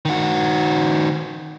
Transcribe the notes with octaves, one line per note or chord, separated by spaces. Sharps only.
D#3 F#4